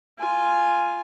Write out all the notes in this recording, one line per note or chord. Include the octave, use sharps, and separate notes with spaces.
F4 G#5